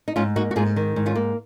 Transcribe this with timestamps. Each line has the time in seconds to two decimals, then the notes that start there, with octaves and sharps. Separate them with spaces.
0.08 D#4
0.16 G#2 C#4 F4
0.36 A#3 D#4 F#4
0.51 F#4
0.56 G#2 F4 G#4
0.76 D#3
0.96 G#2
1.06 C#4 F4
1.15 A#3